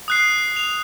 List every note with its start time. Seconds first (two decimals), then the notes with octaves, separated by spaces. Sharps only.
0.08 D#6 F#6 C7
0.56 F7